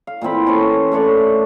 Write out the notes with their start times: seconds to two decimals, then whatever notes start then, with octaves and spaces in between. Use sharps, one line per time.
0.07 F5
0.21 A#2 E3 C4 B5
0.46 C#4 A4 B4 C5
0.92 A3 D4 C#5 D5